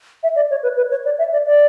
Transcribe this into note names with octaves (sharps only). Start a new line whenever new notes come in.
E5
D5
C#5
B4
B4
C#5
D5
E5
D5
D5